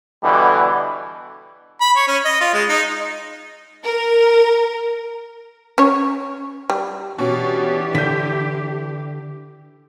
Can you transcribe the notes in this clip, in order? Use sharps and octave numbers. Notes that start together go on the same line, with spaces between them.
B2 D3 E3 G3
B5
C#5
C#4
D#5
F4
G#3
D#4
A#4
C#4 C#5
G3
B2 E3 C#4 D4 G4
D3 G6 B6